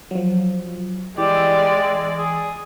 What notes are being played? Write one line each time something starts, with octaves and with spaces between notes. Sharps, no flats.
F3 F#3
E3 G#3 G4 D5 E6
G#4